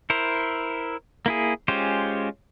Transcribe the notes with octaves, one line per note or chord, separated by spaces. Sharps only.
E4 A#4 C5
A#3 E4 G#4
G#3 C#4 F4 G4 C5